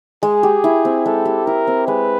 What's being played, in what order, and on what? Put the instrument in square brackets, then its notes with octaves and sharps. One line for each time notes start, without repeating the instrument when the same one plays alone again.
[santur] G#3 [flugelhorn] G#4
[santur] G4
E4
C4
[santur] G#3 [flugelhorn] A4
[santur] G4
[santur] E4 [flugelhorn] A#4
[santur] C4
[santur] G#3 [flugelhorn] B4